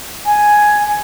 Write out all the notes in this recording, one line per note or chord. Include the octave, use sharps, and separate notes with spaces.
G#5